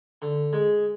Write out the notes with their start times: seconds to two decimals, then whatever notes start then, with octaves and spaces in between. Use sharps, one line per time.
0.22 D3
0.53 G#3